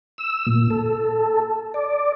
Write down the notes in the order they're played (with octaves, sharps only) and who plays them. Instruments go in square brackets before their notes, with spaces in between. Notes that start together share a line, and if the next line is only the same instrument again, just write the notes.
[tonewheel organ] E6
A#2
A4
D5